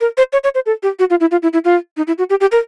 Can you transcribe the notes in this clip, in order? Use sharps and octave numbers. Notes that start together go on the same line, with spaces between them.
A#4
C5
C#5
C#5
C5
A4
G4
F#4
F4
E4
F4
E4
E4
F4
D#4
E4
F#4
G4
G4
A#4